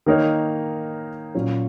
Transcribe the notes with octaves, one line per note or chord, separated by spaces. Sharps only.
D#3 A#3 D#4 A#4 C#5
A#2 F#3 C#4